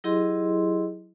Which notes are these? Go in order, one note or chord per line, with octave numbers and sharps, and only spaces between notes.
F#3 E4 G4 G#4 D#5 C6